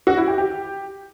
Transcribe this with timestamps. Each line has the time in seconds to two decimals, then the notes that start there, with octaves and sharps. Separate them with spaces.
0.07 F#4
0.17 E4
0.28 G4
0.38 G4